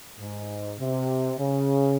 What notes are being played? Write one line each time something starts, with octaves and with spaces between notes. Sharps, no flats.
G#2
C3
C#3